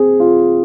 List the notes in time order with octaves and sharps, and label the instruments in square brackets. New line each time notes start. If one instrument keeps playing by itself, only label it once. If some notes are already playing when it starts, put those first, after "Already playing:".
Already playing: [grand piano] C4 G#4
F4